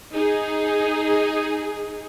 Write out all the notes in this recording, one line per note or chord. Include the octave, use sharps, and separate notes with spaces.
D#4 G#4